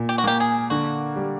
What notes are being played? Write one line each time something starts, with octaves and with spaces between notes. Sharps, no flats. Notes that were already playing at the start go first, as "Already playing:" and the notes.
Already playing: A#2
G4
F#4
A#3 G4
G#4
D3 F#4
G3